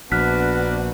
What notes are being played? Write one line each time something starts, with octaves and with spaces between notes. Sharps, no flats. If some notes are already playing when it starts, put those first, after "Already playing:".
A#1 B3 D4 F#4 F6 F#6 B6